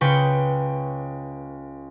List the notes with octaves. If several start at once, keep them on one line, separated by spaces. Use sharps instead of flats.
C#2 C#3 B4 G5 C#6